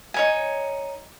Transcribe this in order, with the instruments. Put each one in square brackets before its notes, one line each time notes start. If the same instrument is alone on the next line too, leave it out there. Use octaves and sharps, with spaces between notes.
[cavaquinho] D#4 C#5 G#5